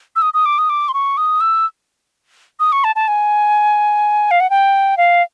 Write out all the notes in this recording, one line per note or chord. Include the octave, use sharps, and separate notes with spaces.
E6
D#6
D#6
D6
D#6
D6
C6
C#6
D#6
E6
D#6
C#6
A5
A5
G#5
F5
F#5
G5
F5